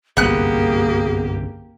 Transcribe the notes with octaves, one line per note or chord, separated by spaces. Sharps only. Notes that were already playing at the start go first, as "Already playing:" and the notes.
G1 C2 F#2 A#3 B3 G4 G#4 F#6